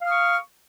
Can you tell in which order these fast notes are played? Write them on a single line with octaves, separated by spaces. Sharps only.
F5 F6 D#6 C#6